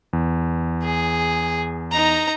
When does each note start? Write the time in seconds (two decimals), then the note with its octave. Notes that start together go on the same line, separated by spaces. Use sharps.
0.13 E2
0.83 G#4
1.91 D#4 A#5